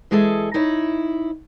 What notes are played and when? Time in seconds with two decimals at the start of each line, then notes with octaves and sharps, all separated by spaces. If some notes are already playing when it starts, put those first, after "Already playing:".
0.11 E3 G#3 G#4 A4 E5
0.54 D#4 E4 C#5